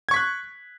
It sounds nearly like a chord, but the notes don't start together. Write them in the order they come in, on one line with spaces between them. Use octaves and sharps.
G#6 C#6 B6 F#6